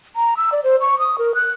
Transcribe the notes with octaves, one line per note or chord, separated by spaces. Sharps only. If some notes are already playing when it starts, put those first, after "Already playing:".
A#5
E6
D5
C5
C#6
D#6
A#4
F#6